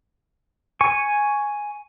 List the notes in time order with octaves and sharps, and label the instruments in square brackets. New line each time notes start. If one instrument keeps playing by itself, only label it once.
[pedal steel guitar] G#5 C#6